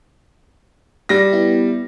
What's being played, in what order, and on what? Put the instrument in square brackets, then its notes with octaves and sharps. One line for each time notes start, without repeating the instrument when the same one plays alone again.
[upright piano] G3 A#6
[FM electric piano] B3 E4